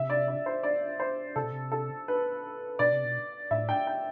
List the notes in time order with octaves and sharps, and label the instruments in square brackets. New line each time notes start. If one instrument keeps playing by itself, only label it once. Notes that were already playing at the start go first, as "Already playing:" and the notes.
Already playing: [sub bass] C3 [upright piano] E5
[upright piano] D5
D5
C5
D5
C5
[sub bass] C3 [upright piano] A4
[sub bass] B2
C3
[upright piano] A4
B4
[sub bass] B2 [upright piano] D5
[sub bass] C3
B2
[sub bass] A2 [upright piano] E5
[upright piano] G5
G5